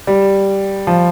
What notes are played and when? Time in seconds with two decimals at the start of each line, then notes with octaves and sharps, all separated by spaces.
0.07 G3
0.87 F3